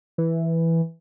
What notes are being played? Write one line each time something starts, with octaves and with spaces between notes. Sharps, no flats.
E3